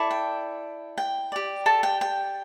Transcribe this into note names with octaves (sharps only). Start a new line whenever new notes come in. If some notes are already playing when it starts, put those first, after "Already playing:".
Already playing: E4 A4 D5
G5
G5
G4 D5
A4 A5
G5
G5